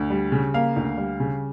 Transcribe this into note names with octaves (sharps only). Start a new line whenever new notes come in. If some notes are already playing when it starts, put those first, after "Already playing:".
Already playing: D2
G3
C#3
A#3 F5
D2
G3
C#3